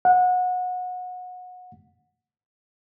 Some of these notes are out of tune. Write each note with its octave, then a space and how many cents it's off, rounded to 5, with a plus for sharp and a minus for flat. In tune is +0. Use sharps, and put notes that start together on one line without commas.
F#5 -25